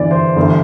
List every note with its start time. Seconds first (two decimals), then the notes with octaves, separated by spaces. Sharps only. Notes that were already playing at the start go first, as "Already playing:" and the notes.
Already playing: G1 G2 E3 D5
0.11 C5
0.36 G1 G2 E3